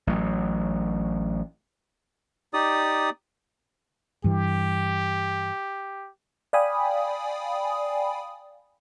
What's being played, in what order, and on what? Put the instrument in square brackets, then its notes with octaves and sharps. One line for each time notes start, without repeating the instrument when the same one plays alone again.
[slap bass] A1 A2 F#3
[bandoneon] D#4 G4 D5 D#6
[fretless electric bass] G2 E3 [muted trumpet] G4
[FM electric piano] D5 F5 G5 G#5 B5 D#6